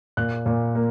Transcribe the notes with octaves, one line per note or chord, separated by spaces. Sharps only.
A#2 F#6
A#2
A#3